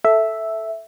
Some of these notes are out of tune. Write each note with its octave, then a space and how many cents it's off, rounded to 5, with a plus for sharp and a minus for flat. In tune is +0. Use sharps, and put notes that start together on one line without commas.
A4 +0 E5 +0